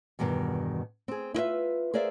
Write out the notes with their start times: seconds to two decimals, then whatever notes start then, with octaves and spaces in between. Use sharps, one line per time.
0.19 E2 G2 B2 D#3
1.08 C4 G#4
1.34 E4 F4 B4 E5
1.94 G#4 A#4 C5 D5 E5 F5